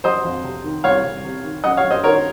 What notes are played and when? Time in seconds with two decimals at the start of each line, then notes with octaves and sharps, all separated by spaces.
0.04 F#3 C5 D#5
0.24 F2
0.44 C3
0.64 D#3
0.84 C2 C#5 F5
1.04 C2
1.24 C3
1.43 D#3
1.64 F#2 D#5 F#5
1.77 C#5 F5
1.84 F#2
1.91 C5 D#5
2.03 D#3 A#4 C#5